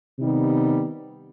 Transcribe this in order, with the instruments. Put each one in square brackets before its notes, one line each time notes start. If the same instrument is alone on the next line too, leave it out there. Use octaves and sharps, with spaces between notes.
[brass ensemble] C3 D#3 G3 B3 D#4